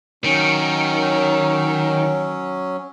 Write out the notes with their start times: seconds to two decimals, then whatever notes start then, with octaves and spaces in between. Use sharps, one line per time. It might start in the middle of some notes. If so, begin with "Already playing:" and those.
0.24 D#3 F#3 C#4